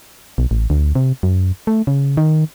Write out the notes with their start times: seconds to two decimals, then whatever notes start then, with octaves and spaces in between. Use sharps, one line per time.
0.38 B1
0.51 A1
0.70 D2
0.95 C3
1.23 F#2
1.67 A3
1.87 C#3
2.17 D#3